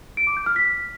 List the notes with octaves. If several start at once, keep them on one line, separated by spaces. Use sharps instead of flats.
D7
D6
G6
F6
B6